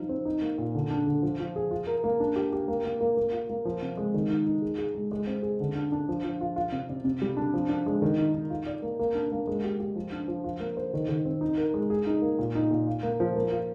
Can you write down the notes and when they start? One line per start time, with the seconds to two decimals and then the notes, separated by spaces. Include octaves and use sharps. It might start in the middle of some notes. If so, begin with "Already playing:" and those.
Already playing: F3 G3 D#4
0.09 C4
0.25 D#4
0.42 A#3
0.58 A#2
0.75 D3
0.90 D4
1.06 D3
1.22 F3
1.40 F3
1.56 G#4
1.71 F4
1.87 A#4
2.04 A#3
2.20 D4
2.36 G4
2.53 G4
2.68 A#3
2.85 A#3
3.01 A#3
3.17 A#3
3.33 F4
3.50 A#3
3.65 F3
3.82 C3
3.97 G#3
4.14 D#3
4.30 D#4
4.46 D#4
4.62 G#4
4.78 G#4
4.95 G#3
5.11 G#3
5.27 C4
5.43 G#4
5.60 D3
5.75 D4
5.92 D4
6.09 F3
6.24 F3
6.41 F4
6.56 F4
6.72 C3
6.89 C3
7.05 C3
7.22 G3
7.37 D4
7.54 F3
7.69 D4
7.86 G#3
8.02 D#3
8.19 D#4
8.34 D#4
8.50 F4
8.66 D5
8.82 A#3
8.99 A#3
9.15 D4
9.32 A#3
9.47 G#3
9.64 G4
9.80 G4
9.96 F3
10.12 D4
10.28 F3
10.44 F4
10.60 A#3
10.77 C5
10.94 D#3
11.09 D#3
11.25 C4
11.41 D#4
11.58 A#4
11.74 G#3
11.90 G#4
12.07 D#4
12.22 A#3
12.39 A#2
12.55 D#4
12.71 A#2
12.87 F4
13.03 A#3
13.20 F3
13.35 A#3
13.52 F4